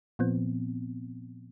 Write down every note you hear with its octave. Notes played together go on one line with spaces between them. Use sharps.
A#2 F3 B3 C4